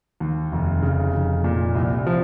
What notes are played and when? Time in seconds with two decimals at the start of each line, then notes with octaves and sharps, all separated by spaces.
0.20 D#2
0.52 F1
0.82 C#3
1.14 F1
1.44 A#2
1.75 C2
2.07 F3